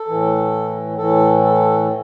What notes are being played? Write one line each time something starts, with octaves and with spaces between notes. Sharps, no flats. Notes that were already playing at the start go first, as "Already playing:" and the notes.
Already playing: A4
A2 E3
A2 E3 A4
A4